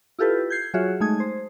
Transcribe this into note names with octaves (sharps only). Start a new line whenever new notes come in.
E4 F4 G4 A4 B4
G6 G#6 C7
F#3 F4 F#4 G#4 C#5 E5
G#3 A3 D#4 D#6 G#6
C5